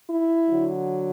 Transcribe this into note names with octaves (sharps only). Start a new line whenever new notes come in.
E4
D3 F#3